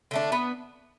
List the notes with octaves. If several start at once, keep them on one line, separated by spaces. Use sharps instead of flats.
D3 A3 D4
B3 B4